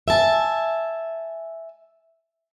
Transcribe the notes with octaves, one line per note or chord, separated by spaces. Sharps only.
E5 G#5 A5